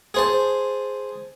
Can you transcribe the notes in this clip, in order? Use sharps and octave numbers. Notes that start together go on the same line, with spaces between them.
G#4 C5 A5